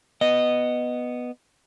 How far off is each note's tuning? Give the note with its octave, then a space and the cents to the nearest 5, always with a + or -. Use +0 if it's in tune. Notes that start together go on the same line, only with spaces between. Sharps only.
B3 +0 D#5 -10